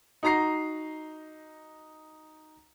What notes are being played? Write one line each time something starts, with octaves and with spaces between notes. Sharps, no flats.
D#4 F#4 A#5 A#6 C7